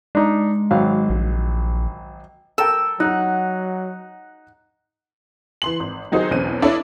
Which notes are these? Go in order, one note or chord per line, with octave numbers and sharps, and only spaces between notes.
G#3 D4 D#4
G#1 F#3 F5
A#1
A4 A#4 G5 E6
F#3 D#4 F#5 F#6
E3 C6 F#7
G#1
D#3 F#3 D#4 F#4 G#4 C5
B1 E2 C4 C#4 D#7
D4 E4 A4 C#5 D#5